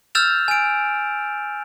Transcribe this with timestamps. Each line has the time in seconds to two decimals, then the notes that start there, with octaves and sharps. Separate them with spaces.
0.15 E6 F6 G6 A6 E7 F7
0.48 G#5 D7